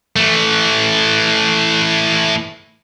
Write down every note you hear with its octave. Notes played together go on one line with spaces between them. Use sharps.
E3 A3